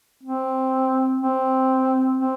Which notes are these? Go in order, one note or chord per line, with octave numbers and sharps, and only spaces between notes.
C4
C4
C4